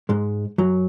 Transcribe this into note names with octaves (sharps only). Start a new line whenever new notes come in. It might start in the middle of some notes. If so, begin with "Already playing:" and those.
G#2 G#3
F#2 F#3